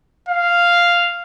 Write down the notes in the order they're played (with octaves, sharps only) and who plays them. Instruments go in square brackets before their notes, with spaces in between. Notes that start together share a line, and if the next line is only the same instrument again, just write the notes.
[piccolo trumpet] F5